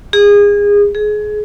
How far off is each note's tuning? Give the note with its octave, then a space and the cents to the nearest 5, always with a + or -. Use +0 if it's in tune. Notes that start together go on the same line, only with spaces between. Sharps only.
G#4 -25
G#4 +25